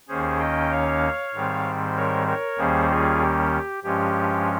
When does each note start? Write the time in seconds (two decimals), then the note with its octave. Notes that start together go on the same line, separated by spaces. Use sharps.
0.08 D#2 D#3 A#3 C#4 G#4 C5
0.40 D#5 G5
0.71 C#5 F5
1.34 G#2 D#3 G3 C4
1.96 A#4 C#5
2.27 A#4 C#5
2.58 D#2 D#3 G3 A#3 C#4 G#4 C5
2.90 F4 G#4
3.21 G4
3.83 G2 F3 G#3 C#4 G4